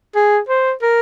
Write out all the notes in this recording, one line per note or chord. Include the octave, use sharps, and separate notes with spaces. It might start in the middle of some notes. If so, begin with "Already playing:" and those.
G#4
C5
A#4